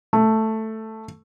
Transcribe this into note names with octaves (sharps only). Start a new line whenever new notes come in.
A3